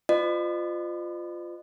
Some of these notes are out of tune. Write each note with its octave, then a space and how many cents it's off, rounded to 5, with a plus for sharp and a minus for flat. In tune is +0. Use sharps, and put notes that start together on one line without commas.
F4 +0 C5 -35 D#5 -45